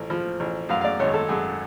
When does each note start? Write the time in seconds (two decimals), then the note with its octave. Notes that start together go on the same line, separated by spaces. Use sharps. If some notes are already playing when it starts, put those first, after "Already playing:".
Already playing: A1 F3
0.10 F3
0.40 A1
0.69 F#2 F5
0.81 F5
0.84 D5
0.99 G#1 C#5
1.14 A4
1.28 F#2 G#4